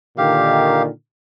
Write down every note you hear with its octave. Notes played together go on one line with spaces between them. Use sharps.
A#2 D3 D#3 G4 F5